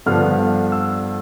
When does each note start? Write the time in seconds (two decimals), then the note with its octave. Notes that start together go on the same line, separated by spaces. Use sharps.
0.06 G2 D3 F3 B3 D4 F6
0.72 E6